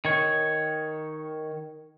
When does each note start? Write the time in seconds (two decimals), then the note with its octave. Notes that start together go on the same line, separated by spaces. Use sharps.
0.05 D#3 C#5